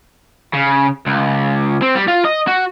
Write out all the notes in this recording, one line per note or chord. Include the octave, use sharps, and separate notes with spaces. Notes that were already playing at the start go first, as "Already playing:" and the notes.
C#3
C#2
C4
G3
F4
D#5
F#4